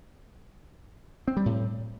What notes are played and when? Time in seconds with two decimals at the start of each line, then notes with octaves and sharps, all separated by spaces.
1.28 C4
1.37 G3
1.46 A2